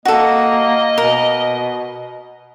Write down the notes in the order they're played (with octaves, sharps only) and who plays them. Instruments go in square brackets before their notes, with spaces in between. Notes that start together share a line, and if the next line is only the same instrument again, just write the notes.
[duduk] A#3 [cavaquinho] F#4 A4 [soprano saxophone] D#5
[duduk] B2 [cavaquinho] A#4